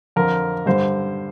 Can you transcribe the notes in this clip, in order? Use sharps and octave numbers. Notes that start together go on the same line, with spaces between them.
F2 D3 A#4
G2 D3 C5